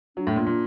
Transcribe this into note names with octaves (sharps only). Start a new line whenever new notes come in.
F#3 D4
A2
A#2
A#2